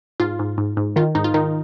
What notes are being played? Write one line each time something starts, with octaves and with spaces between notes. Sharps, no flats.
G#2 F4
G#2
G#2
G#2
D#3 F4
G#2 D#4
F4
D#3 D#4